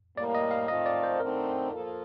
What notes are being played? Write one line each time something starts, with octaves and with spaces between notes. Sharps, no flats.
A2 G3 A#3 D5
D#5
F5
D#3 A3 C4 F4 A4 D#5
D5
C5
D3 A3 C4 D#4 A#4
F3 A#3 F4 A4